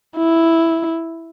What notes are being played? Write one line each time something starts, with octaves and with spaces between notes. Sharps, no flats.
E4